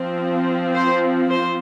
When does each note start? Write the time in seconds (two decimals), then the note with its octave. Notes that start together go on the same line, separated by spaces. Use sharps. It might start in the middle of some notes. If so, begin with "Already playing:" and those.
Already playing: F3 C4
0.74 C5
1.30 C5